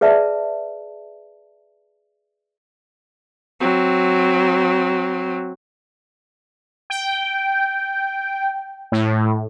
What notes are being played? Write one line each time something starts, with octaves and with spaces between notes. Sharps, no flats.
G#4 B4 D5 E5 A5
F#3 C4
G5
A2